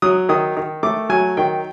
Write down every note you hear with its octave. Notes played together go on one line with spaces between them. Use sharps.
F#3 D#6
D#3 D#6
D#3
A3 D6
F#3 G#5
D#3 G5